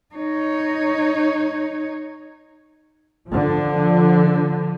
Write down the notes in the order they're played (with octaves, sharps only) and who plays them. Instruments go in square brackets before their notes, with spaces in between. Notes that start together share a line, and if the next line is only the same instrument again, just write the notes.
[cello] D#4 C#5
[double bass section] D3 F3